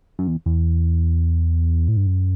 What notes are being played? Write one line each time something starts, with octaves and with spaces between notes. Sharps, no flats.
F#2
E2
E2
A2
G2
F#2